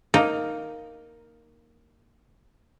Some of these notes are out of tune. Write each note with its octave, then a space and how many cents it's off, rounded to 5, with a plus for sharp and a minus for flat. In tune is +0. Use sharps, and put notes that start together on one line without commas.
A#3 +0 D#4 +0 A#5 +0